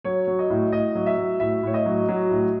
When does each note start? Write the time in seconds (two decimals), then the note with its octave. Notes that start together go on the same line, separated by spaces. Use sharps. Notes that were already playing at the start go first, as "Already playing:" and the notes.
0.04 F#3 C#5
0.27 F#3
0.39 D#5
0.50 A2
0.72 A2 D#5
0.95 F#3
1.06 E5
1.18 F#3
1.40 A2 E5
1.63 A2 C#5
1.74 D#5
1.86 F#3
2.08 F#3
2.31 A2